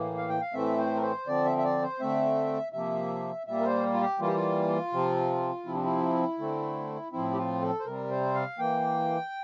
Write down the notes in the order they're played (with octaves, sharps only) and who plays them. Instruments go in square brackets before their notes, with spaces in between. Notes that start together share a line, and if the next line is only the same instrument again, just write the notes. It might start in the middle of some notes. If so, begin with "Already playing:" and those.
Already playing: [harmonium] A2 E3 A#3
F5
G5
F5
A2 E3 A3 C4 E5
C5
A#4
C5
D3 F3 C4 D5
E5
E5
D5
C5
D3 A3 C4 E5
C3 F3 A#3 E5
A#2 G3 A#3 E5
A#4
C5
F4
G4
E3 G3 A#3 F4
G4
F4
C3 F3 C4
C3 F3 C4 E4
D4
E4
D3 A3 C4
A2 F3 C4 E4
G4
F4
A4
C5
C3 G3 C4 A#4
C5
F5
E3 A#3 G5